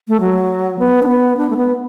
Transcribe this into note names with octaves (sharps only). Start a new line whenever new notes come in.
A3
F#3
B3
D4
B3
D4
A3
B3